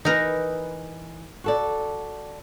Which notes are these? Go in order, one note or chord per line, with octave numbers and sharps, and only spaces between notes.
E3 D#4 A#4 B4 D#5
F#4 A4 D5